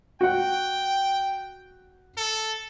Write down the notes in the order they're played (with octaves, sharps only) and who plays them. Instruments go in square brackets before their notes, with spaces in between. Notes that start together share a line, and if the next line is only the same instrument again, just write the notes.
[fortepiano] F#4 F#5 [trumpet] G5
[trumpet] A4